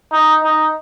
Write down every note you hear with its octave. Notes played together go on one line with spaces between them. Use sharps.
D#4
D#4